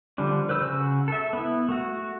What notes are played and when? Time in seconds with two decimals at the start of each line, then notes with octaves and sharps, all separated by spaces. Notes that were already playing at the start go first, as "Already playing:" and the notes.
0.18 D3 F3 G3 D4
0.49 B4 C5 E6
0.61 C#3 F#4 E6
1.08 A4 E5
1.33 B3 E4
1.69 A3 F#4